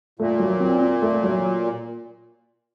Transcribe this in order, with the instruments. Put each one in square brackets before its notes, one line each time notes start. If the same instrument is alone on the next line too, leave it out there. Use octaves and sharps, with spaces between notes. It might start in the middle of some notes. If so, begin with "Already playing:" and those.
[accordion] A#2 [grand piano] A3
[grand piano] F#3
C4
F4
A3
F#3